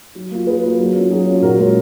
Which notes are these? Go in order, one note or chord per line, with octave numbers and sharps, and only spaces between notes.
F#3
A#3 F4
F#3 G#4 B4
A#3 F4
F#3
C#4 F4
F#3 G#4
C#4 F4
A#2 F#4 A#4
G#3 C#4 F4